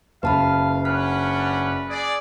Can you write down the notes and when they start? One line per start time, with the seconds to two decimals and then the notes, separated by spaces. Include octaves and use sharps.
0.23 F#1 B4 F5 A5 B5
0.85 C#4 D4 B4 F#5 F6
1.89 G#4 D5